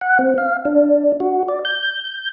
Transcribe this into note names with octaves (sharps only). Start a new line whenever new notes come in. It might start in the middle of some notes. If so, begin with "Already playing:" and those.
F#5
C4
F5
D4
F#4
D5
G6